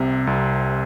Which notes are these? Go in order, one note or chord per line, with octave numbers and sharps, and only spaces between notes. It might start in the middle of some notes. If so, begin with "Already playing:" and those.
Already playing: C2 C3
C2